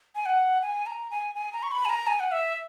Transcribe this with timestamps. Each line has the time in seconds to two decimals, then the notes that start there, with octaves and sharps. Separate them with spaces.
0.15 G#5
0.26 F#5
0.62 G#5
0.86 A#5
1.11 G#5
1.35 G#5
1.53 A#5
1.63 C#6
1.71 B5
1.85 G#5
1.89 A#5
2.07 G#5
2.20 F#5
2.32 E5